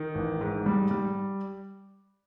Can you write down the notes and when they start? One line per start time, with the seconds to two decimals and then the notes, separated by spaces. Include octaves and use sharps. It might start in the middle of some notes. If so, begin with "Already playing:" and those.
Already playing: D#3
0.15 A1
0.41 G#2
0.66 G3
0.91 G3